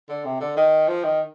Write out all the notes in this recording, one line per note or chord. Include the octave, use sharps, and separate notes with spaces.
D3
C3
D3
D#3
F3
D#3